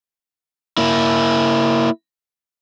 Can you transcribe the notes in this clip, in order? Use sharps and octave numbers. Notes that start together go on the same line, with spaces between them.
A#3 E4